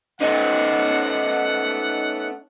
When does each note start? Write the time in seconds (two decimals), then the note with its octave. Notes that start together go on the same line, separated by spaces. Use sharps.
0.21 A3 B3 C#4 D#4 F#5